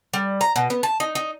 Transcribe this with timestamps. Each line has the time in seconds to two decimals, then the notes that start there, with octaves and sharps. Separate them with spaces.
0.14 G3
0.41 A#5
0.56 B2
0.70 B3
0.83 A5
1.00 D#4
1.15 D#4